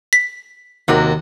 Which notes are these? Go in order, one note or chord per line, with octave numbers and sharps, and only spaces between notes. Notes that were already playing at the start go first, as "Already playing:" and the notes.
B6
D#2 C3 F#4 A#4